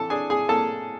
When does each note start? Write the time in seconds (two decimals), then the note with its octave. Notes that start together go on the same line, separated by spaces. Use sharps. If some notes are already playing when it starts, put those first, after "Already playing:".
Already playing: E3 A4 A5
0.10 D4 G#4 G#5
0.30 G#4 G#5
0.48 A#3 A4 A5